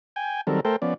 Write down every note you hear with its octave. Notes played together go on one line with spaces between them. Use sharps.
G5 G#5
D#3 F#3 G3 C4 A4 A#4
A3 A4 A#4 C5 G5
F3 B3 C#4 D5